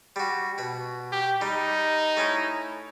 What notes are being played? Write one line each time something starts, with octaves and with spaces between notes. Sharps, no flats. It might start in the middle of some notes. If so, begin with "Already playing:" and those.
G3 F#4
B2 B4
G4
G3 D#4
A3 C#4 E4